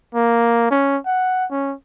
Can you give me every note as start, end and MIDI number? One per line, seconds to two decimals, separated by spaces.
0.15 0.70 58
0.71 0.97 61
1.06 1.45 78
1.51 1.74 61